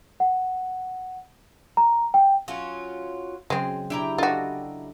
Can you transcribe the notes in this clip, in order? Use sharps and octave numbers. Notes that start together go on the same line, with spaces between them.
F#5
A#5
G5
F#3 C#4 F4
C#3 F#3 G#3 C4
D4 E4 G4 A#5
D4 F4 F#4 A4 D#5